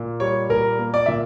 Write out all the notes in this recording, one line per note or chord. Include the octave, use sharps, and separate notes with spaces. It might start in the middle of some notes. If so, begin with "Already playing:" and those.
Already playing: A#2
G3 C#5
A#2 A#4
A#3
D5
A#2 E5